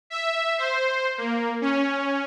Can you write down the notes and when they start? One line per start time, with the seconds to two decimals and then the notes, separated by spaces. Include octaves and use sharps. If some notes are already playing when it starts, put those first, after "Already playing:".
0.10 E5
0.58 C5
1.18 A#3
1.61 C#4